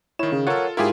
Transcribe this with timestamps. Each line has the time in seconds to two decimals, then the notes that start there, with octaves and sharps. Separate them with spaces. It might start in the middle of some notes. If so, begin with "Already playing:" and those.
0.19 D#3 E4 C#5 E7
0.32 C#3
0.47 F4 A4 A#4 C#5 F#5
0.77 G#2 E4 F4 G4 G#4 A#4